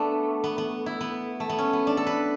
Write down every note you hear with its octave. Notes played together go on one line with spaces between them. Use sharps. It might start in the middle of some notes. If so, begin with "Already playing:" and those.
Already playing: A3 B3 D4
B3
B3
E4
B3
A3
B3
C#4
B3
D4
A4
B4